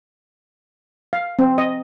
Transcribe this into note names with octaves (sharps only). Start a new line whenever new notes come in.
F5
C4
D#5